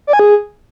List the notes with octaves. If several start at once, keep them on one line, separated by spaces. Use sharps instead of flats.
D5
G#5
G#4